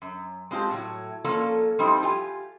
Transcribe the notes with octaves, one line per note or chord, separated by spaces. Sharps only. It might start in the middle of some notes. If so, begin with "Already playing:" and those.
F#2
G#3 C4 F4 G4 A5
A2 F#3
F3 A#3 C#4 F4 A4 D5
F3 G3 A3 C4 D#4 E4
F4 G4 G#5